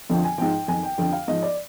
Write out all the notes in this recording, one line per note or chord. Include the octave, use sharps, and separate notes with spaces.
F2 D3 F3 G5
G#5
G#2 F3 G5
F2 D#3 G#5
G5
F2 D3 F3 G5
F5
G#2 F3 D#5
D5